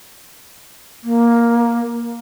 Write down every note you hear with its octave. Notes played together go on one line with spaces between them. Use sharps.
A#3